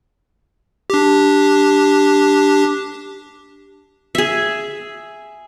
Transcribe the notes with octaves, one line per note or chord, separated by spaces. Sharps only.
D4 G4
G#4 E5